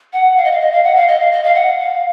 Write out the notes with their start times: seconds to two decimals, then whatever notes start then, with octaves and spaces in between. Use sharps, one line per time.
0.13 F#5
0.37 F5
0.44 D#5
0.52 F5
0.60 D#5
0.72 F5
0.84 F#5
0.96 F5
1.08 D#5
1.20 F5
1.31 D#5
1.44 F5
1.55 F#5
1.79 F5